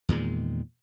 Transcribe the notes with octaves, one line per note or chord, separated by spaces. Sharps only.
E2 A#2 D#3 G#3